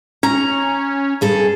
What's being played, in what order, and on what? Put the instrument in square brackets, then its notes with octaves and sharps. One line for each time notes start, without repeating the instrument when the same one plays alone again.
[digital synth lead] C#4 [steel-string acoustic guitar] A#5
[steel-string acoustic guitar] G2 G#4 A4